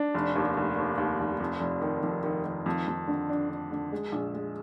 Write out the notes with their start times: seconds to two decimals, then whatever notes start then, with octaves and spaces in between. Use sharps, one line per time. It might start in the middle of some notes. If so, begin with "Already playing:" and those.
Already playing: D4
0.14 F1
0.35 D#2
0.57 F1
0.77 D#2
0.98 D#2
1.19 F1
1.40 F2
1.61 F1
1.82 D#3
2.03 F2
2.24 D#3
2.45 D#3
2.66 F2
2.88 F2
3.08 D3
3.29 D4
3.50 D3
3.71 D3
3.92 G#3
4.12 A#1
4.34 G#3